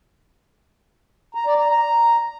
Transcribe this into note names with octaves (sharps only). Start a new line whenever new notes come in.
A#5
D5
A#5
A#5